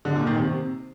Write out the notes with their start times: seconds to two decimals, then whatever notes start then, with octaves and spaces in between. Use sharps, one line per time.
0.05 D3
0.16 A#2
0.27 D#3
0.37 C3